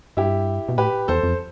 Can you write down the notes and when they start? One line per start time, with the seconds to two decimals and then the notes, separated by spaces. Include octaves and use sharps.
0.17 G2 E4 G4
0.69 B2
0.78 A2 G4 B4
1.08 E2 A4 C5
1.23 F2